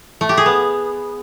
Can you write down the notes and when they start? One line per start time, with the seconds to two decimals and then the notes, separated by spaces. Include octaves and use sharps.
0.21 A3
0.29 G4
0.37 G#4
0.46 B3